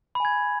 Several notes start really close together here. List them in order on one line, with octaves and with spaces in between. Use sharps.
B5 G#5 G#6